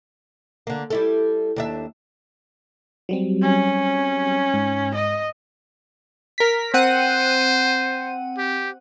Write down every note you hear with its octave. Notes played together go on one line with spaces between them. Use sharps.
D3 A#3
G3 E4 A4
D#2 D4 E5
F#3 G3 C4
C#4
G#2
D#5
A#4 B6
C4 C5 F#5 D#7
G4